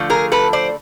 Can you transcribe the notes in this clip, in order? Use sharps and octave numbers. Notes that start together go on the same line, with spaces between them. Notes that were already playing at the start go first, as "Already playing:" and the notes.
Already playing: D3 F3 A3
G#4 A#4
A4 B4
C5 D5